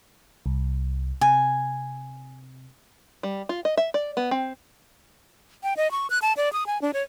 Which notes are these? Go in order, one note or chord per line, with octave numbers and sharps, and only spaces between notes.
C2
C3 G#5
G3
F4
D#5
E5
D5
B3
C4
G5
D#5
C#6
F#6
A5
D5
D#6
G#5
D4
C#5